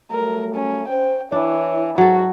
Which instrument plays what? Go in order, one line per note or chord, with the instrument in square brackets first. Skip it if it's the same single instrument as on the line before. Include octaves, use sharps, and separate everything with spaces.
[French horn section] F#3 G3 A3 [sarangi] A#4
[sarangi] C#4
[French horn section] C#4 C5 [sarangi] G5
[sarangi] E3 [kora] D4 [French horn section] E4 C#5
[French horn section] G#2 [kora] F#3 A4 [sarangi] F#4